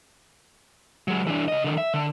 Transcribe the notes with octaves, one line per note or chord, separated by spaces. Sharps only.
F#3 G#3
E3 D4
C#3 D#5
D3 D#3
E5
D3